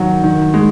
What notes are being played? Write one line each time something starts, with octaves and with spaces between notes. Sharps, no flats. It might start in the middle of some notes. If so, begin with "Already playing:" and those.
Already playing: D#3 F#3
D#3
G#3